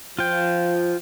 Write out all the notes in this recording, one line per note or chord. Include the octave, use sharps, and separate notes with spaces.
F3 F4 G5